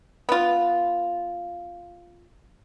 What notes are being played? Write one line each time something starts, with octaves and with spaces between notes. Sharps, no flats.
B3 F4